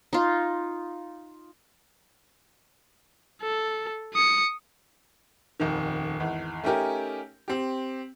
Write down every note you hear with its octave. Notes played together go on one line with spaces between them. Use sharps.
D#4 F4
A4
D#6 C#7
D#1 F2 D#3
G#1 E2
A3 C#4 D#4 G4 A#4 G#5
C4 G4